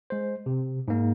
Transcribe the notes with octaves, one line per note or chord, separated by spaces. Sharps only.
G#3 C5
C3
G#2 A#3